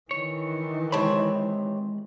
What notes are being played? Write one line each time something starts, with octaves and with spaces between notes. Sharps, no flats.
D#3 E3 C#5
C3 G#3 C4 C#5 A5 B5